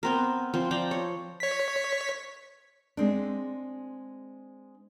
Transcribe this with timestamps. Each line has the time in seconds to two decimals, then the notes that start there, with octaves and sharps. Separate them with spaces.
0.03 B3 C4 A#4
0.54 F3 C4
0.71 F3 D5 G5 A#5
0.91 C#5
1.40 C#5 B6
2.97 G#3 C4 D4